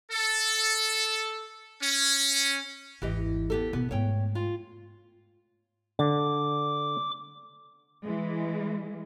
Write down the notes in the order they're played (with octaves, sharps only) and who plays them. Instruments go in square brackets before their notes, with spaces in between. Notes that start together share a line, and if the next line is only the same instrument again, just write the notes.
[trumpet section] A4
C#4
[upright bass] G#1 E2 [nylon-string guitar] E3 G4 D#5
[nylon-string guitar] B3 G4 A4
[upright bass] B2 [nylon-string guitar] B3
[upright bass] G#2 A3 [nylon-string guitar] C#5 G5
[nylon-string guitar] F4
[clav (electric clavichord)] D3 [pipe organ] D6
[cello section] E3 G#3